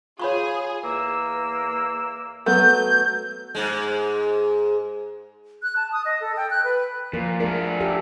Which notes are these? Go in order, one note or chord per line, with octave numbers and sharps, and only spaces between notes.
F4 G#4 C#5 B5 C#6
E2 A#3 E6
F#3 A3 B3 G6
G#2 G#3
F#6
A5
D#6
D#5
A4
G5
F#6
B4
A#2 F3 A#4
A3 D4 G#4 A#4
G4 A4